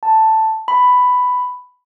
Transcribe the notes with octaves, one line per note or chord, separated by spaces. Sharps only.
A5
B5